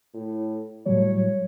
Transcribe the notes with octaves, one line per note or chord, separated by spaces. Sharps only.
A2
A2 F#3 G3 C#5